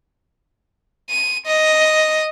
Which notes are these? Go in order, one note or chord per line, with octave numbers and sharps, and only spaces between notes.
D#7
D#5